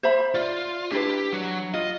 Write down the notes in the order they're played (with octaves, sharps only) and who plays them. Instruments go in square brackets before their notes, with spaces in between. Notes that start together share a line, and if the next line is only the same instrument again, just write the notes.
[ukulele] C5 E5 B5
[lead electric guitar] F4 [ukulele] D5
[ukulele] D4 E4 B4 [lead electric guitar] G4
[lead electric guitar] F#3
[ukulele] F4 [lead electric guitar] D#5